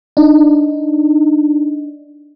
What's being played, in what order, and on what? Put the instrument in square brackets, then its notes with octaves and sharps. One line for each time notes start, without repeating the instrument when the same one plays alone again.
[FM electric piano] D4 D#4